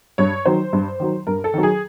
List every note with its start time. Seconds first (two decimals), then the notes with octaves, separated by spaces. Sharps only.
0.18 G2 C#5
0.46 D#3 F#3 C5
0.73 G2
1.00 D#3 F#3
1.27 G2 A#4
1.44 A4
1.54 D#3 F#3
1.63 G#4